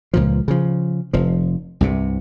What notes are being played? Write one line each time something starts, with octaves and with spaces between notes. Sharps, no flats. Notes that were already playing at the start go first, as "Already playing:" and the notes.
C#2 A#2 F3
C#3 F3
F1 F3
C2 G2 C3